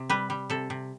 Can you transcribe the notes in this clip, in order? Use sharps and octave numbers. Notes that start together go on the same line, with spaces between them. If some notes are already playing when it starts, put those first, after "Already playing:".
Already playing: C3
G3 B4
G3
C3 A4
C3